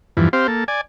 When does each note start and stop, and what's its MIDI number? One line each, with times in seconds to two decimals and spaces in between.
0.17 0.29 40
0.17 0.29 43
0.17 0.29 52
0.17 0.29 53
0.33 0.47 60
0.33 0.47 67
0.33 0.47 72
0.33 0.47 77
0.48 0.64 58
0.48 0.64 69
0.68 0.81 74
0.68 0.81 80